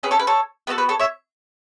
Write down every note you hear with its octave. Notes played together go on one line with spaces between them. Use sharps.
C#4 G#4 B4
A4 C#5
B4
A4 C#5
B3 D4 F#4 A4 B4
B4
A4 C#5
C#5 E5